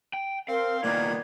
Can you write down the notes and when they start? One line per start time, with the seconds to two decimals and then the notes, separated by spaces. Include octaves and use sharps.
0.13 G5
0.49 C4 A#4 F5 C6
0.83 C2 A#2 D#3 A#3 B3 D5 G#6